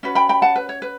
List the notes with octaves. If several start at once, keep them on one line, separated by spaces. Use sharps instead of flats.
C#4 F#4 B4
G5 B5
G5 B5
F#5 A5
B4
C#5
B4